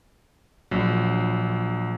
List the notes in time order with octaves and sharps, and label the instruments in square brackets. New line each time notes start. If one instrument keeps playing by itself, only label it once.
[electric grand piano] A#1 F#3